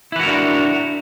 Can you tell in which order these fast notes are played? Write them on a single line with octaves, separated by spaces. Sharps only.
E4 B4 F#4 A#4 D4